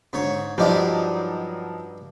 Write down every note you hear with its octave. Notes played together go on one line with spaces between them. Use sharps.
G#2 D3 C#5
G2 F3 F#3 D4 D#4 G4